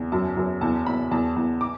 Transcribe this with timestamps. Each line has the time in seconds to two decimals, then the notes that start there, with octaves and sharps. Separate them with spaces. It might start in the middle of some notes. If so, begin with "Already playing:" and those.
Already playing: E2
0.12 F#2 A5
0.36 F#2
0.61 E2 A5
0.86 E2 B5
1.11 E2 A5
1.36 E2
1.61 D6